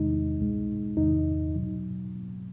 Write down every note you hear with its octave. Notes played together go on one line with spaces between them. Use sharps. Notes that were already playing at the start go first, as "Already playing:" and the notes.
Already playing: E2 C3 D#3 G#3 D#4
C2 B2 G#3
E2 C3 D#3 D#4
B2 F#3